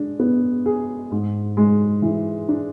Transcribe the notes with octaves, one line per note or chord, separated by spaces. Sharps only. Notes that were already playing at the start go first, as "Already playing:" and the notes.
Already playing: G#3 D4
B3
G#4
G#2
G#3
E3
D4